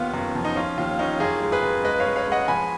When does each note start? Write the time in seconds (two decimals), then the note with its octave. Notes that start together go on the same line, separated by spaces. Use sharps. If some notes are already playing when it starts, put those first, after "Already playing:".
Already playing: D#2 B3 F4
0.14 F#2
0.35 F3
0.45 D#4
0.56 C#4 F4
0.78 D#2 F4
0.99 C#4 D#4
1.20 F#2 F4 G#4
1.42 G#3
1.52 G#4 B4
1.63 F#2
1.84 G#3 B4 D#5
2.00 C#5 F5
2.06 G#3
2.16 C#5 F5
2.27 G#3 D#5 F#5
2.48 F3 G#5 B5